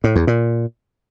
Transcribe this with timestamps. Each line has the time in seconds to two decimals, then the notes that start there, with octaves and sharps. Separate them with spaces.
0.04 A2
0.16 E2
0.27 A#2